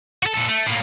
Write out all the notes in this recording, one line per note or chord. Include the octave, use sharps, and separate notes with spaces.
F#4 A4
A#2 A4
A3
A2 A#3